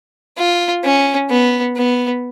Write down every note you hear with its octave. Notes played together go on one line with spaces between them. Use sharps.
F4
C#4
B3
B3